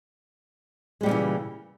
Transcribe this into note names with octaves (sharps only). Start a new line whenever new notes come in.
A#2 C#3 E3 G3 G#3